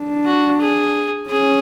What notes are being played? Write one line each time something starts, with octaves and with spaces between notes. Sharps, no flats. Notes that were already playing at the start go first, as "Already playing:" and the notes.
Already playing: D4
F#4
G#4
C#4 G#4